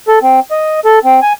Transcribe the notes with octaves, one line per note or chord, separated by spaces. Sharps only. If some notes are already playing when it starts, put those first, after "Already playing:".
A4
C4
D#5
A4
C4
G#5